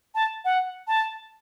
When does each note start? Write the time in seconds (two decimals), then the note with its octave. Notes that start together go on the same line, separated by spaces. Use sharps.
0.15 A5
0.45 F#5
0.88 A5